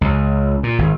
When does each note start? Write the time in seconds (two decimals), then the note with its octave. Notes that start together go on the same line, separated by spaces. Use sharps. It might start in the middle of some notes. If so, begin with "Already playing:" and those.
0.01 C#2
0.63 A#2
0.78 G#1